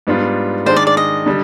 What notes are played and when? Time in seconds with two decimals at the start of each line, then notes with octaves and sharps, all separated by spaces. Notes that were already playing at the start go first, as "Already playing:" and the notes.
0.07 G#2 G3 B3 D4 F4
0.66 D#3 G#3 D4 C5
0.76 D5
0.87 D5
0.97 D#5
1.26 D3 G3